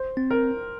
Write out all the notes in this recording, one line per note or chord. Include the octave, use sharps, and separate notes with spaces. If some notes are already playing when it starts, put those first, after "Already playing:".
Already playing: C5
C4
A#4